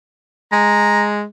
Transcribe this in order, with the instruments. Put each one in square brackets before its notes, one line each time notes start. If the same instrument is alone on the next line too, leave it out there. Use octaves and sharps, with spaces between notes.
[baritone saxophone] G#3 [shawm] A#5